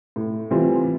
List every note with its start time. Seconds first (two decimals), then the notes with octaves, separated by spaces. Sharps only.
0.16 A2
0.51 E3 G3 C4 F4